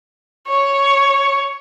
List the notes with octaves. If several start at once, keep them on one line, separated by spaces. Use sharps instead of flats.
C#5